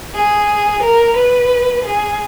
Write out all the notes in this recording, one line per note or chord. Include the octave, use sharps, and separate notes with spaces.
G#4
A#4
B4
G#4